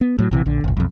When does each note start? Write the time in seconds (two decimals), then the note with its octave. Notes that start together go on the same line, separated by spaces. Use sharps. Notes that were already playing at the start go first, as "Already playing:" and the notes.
0.01 B3
0.18 A2 F#3
0.31 A#1 C3 E3
0.46 A#1 D3
0.64 G1 C2
0.77 B1 F2